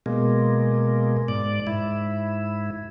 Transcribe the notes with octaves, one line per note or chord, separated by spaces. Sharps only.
B2 G#3 A#3
G#2 D5
G#2 E4